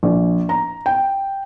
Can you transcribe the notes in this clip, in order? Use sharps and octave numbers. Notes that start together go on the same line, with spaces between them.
A#1
A#5
G5